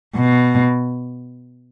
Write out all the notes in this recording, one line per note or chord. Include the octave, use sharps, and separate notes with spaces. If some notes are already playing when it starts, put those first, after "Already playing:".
B2